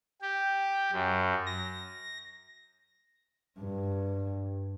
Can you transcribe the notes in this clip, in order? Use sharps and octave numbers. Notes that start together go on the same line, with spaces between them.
G4
F#2
A#6
G2